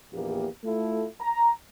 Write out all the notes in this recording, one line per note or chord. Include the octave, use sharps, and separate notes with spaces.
A#1 E2 A#3 G4
A3 E4 F4 A4
A#5